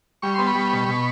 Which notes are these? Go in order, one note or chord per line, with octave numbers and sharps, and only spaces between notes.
G3 C#6
B3 C6
B5 C#6
G3
B2
B2